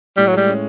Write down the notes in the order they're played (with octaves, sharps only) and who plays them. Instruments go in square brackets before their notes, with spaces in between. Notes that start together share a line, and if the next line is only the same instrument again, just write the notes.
[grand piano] A2 [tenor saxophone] G3
[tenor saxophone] F#3
[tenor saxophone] G3 [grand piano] G#3
[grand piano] C#4